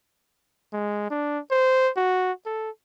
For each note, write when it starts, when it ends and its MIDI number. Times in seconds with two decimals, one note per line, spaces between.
0.73 1.06 56
1.10 1.39 62
1.51 1.90 72
1.96 2.32 66
2.46 2.70 69